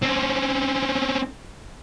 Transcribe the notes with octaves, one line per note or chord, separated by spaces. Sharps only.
C4 C#4